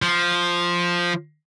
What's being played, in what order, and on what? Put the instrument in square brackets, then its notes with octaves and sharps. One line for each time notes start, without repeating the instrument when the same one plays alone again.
[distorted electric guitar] F3